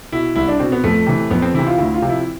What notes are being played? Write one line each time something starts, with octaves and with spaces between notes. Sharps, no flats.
B2 E4
C2 E4
D4
B2 C4
B3
F2 A3
C3 E3
F2 B3
C4
C3 E3 E4
F4
D2 E4
F4
C3 F3
E4